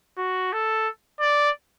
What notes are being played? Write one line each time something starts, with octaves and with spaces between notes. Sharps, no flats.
F#4
A4
D5